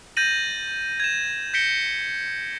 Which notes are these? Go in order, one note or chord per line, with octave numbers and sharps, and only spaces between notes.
G6 A6 A#6 D#7 F#7
G#6 E7
G6 A#6 B6 C#7 D7 G7